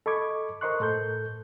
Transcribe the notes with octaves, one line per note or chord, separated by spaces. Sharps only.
A4 D#5 B5 C#6 D6 G#6
A#4 C5 D#5 C6 C#6 F#6
A2 A4 G6